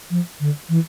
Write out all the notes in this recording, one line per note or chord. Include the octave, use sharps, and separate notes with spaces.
F3
D3
E3